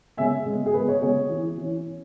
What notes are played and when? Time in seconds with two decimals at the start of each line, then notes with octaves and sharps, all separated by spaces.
0.17 C#3 G#3 B3 E5 G#5
0.46 C#3 G#3 B3
0.66 G#4
0.74 C#3 G#3 B3 B4
0.87 G#4 C#5
1.01 C#3 G#3 B3 G#4 C#5
1.29 E3 C#4
1.58 E3 C#4
1.86 C#4